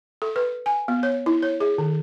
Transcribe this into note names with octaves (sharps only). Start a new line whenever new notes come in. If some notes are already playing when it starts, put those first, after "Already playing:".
A4
B4
G#5
B3
C#5
E4
C#5
G#4
D#3